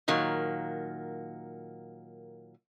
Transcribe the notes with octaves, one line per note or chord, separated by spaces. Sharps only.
A#2 D#3 F#3 A#3